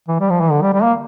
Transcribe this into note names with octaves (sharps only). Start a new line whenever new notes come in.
E3
G3
F3
E3
D3
G3
G3
A#3